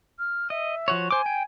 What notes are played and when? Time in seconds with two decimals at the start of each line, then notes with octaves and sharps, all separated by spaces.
0.18 F6
0.50 D#5 E5
0.88 F3 F#4 C#5
1.11 C5 G#5 D6
1.26 G5